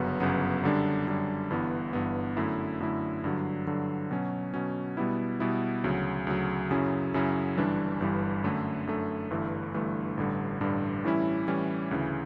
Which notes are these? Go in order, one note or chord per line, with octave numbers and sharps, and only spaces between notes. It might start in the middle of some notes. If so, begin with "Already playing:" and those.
Already playing: G1 F#2 C#3 F#3 B3
G1 F#2 C#3 F#3 B3
F#2 D3 G3 D4
F#2 D3 G3 D4
G1 G2 E3 B3
G1 G2 E3 B3
F#2 D3 A3 E4
F#2 D3 A3 E4
G2 D3 F#3
G2 D3 F#3
B2 F#3 C#4
B2 F#3 C#4
B2 G3 B3 E4
B2 G3 B3 E4
D2 C#3 F#3
D2 C#3 F#3
F#2 C#3 F#3 C#4 E4
F#2 C#3 F#3 C#4 E4
G1 G2 E3 G3 D4
G1 G2 E3 G3 D4
F#2 D3 A3
F#2 D3 A3
G1 G2 E3 A3
G1 G2 E3 A3
A1 G2 D3 G3
A1 G2 D3 G3
A2 E3 G3 C#4 E4
A2 E3 G3 C#4 E4
D2 C#3 E3